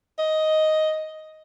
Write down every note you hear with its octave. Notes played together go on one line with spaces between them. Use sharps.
D#5